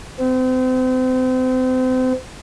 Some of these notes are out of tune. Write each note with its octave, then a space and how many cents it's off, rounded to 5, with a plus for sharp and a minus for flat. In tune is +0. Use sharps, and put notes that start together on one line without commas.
C4 -35